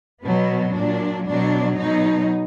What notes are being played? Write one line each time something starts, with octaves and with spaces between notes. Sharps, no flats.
B2 F#3 B3
A#2 F#3 D4
B2 F#3 D4
B2 F#3 D#4